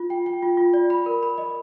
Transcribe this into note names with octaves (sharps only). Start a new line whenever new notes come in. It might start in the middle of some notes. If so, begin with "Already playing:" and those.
Already playing: F4
G5
G5
F4
F4
D5
B5
A#4
B5
D#5